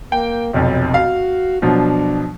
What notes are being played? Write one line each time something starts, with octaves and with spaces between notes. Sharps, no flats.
A#3 G5
F1 B1 F2 F#3
F#4 F5
B2 F3 F#3 D4